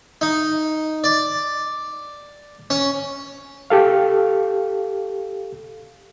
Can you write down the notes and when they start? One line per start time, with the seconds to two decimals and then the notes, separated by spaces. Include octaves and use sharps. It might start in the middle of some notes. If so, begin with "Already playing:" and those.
0.21 D#4
1.04 D5
2.70 C#4
3.70 G4 A4 F5